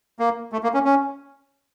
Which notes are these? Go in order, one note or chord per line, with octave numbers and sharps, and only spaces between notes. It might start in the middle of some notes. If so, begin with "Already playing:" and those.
A#3
A3
A#3
C#4
C#4